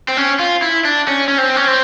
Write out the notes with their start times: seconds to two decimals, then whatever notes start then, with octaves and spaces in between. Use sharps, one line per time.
0.08 C4
0.17 C#4
0.39 F4
0.62 E4
0.85 D4
1.08 C#4
1.28 C#4
1.38 C4
1.56 C#4
1.67 C4